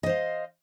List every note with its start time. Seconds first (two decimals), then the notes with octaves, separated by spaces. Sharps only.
0.03 D#5
0.06 C5
0.09 F5